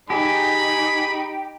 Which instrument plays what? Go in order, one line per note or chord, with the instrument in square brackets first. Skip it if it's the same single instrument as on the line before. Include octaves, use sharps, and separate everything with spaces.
[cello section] D#4 [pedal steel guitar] G4 [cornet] G#4 [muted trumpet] B5